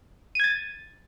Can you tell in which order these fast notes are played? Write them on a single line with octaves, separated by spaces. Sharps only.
D#7 G#6 A6